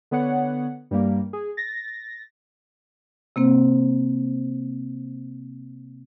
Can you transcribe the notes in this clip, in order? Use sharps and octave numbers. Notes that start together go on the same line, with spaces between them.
D3 B3 C#5 F#5
G2 G3 A#3
G#4
A6 A#6
C3 A#3 C4 C5